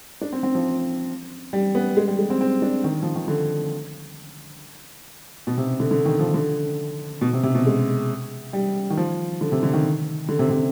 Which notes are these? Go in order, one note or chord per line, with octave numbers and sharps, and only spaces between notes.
D4
C4
C4
F3
G3
B3
G#3
G3
G#3
C4
C4
D4
D#3
F3
D#3
D3
B2
C3
D3
D3
D#3
F3
D3
B2
C3
C3
B2
G#3
G3
D#3
F3
D3
C3
D3
D#3
D3
C3
C3